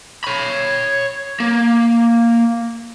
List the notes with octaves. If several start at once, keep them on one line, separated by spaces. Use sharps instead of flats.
C#5 B5
A#3